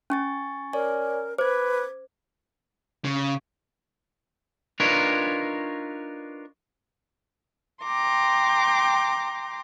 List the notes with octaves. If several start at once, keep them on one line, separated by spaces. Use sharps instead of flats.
C#4 G#5 C#6 A6
A#4 C#5 D5 G#5
B4 C5 D6 G#6
C#3
D4 D#4 F4 A#4 B4 C#5
G5 A#5 C6 D6